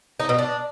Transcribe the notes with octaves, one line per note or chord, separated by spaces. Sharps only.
D#4
B2
D4